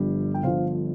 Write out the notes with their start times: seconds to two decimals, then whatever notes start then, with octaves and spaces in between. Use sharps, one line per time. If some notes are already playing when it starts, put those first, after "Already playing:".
Already playing: G1 G2 F3 G4
0.34 G5
0.43 G1 G2 D3 F3 C5 F5